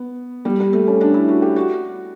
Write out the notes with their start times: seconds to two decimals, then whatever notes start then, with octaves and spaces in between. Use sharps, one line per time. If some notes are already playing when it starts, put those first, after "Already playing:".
Already playing: B3
0.45 G3
0.60 G3
0.73 A3
0.88 C#4
1.01 D4
1.14 E4
1.28 F#4
1.42 G4
1.56 F#4